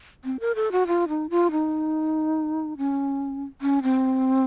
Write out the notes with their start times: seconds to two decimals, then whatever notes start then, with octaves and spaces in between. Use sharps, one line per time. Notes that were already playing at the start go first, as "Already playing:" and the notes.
0.24 C4
0.40 A#4
0.55 A4
0.72 F#4
0.87 F4
1.08 D#4
1.30 F4
1.51 D#4
2.78 C#4
3.62 C#4
3.83 C4